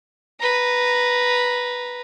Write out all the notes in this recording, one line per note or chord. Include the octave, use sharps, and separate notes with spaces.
B4 A#5